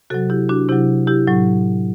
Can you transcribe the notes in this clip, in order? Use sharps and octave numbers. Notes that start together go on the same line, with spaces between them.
C3 F#3 F#4 A4
E4 G4
D4 F#4
C3 F#3 E4 G4
E4 G4
A2 F#3